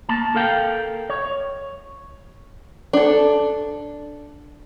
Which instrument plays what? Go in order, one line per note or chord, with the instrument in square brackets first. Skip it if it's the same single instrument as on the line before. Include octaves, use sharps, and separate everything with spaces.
[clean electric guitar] A#3 A5
A4 A#4 F5 G5
C#5
[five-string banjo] D4 A4